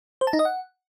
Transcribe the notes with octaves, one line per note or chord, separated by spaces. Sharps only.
C5
A5
D#4
D#5
F#5